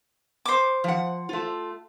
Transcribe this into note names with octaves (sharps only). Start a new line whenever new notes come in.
C5 D6
F3 F#5
A3 F4